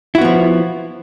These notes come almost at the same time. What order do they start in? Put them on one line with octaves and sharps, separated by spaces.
E4 F#4 B3 F3